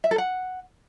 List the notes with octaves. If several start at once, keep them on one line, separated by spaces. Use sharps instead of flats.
E5
A4
F#5